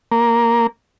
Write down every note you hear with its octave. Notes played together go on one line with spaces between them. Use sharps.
A#3